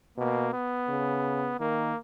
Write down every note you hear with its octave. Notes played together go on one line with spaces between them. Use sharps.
B2 A#3
B3
C#3
D#3 A#3